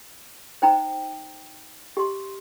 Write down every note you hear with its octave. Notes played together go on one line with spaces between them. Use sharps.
D#4 C5 G5 A#5
G4 D#5 C6